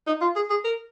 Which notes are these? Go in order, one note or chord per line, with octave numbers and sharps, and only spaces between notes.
D#4
F4
G#4
G#4
A#4